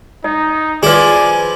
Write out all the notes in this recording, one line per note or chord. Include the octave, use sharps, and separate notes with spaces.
D#4 D#5
F3 E4 G#4 B4 D5 G#5